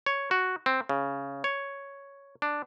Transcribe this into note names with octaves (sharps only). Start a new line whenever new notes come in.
C#5
F#4
C4
C#3
C#5
D4